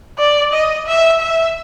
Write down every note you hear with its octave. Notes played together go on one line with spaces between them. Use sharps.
D5
D#5
E5
E5